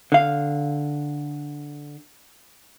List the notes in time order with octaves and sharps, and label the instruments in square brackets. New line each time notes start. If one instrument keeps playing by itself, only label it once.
[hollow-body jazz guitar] D3 F5